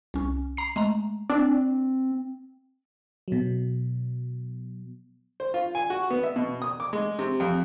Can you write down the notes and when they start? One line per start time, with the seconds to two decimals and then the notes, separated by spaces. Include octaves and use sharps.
0.14 C2 C#4
0.57 A#5 C7
0.76 G#3 A3 A#5
1.30 C4 D4
3.28 B2 F#3
5.40 C5
5.54 F4
5.75 G#5
5.90 F#4
6.10 B3
6.23 E5
6.36 B2
6.62 D#6
6.80 D6
6.93 G#3
7.19 C3
7.40 F2